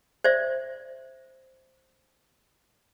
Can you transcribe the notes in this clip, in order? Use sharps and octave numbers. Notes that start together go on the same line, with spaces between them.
C5 D5 E5